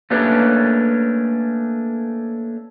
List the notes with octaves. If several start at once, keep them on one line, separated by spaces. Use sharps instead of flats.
A3 A#3 C#4 D4 G4 B4